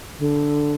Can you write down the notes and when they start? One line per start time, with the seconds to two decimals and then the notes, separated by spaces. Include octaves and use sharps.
0.19 D3